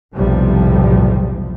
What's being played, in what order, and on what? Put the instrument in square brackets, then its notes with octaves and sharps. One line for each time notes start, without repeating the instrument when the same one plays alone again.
[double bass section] B1 E2 A2 C3 F3 G3